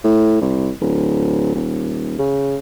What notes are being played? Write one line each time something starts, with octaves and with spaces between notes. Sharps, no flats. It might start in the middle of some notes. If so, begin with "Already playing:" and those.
A2
C2
D1
D#1
C#3